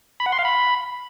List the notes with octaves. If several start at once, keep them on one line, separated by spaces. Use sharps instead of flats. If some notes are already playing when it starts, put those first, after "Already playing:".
B5
F#5
C6
F5
B5